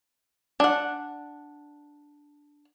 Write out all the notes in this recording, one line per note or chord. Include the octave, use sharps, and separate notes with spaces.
D4 F#5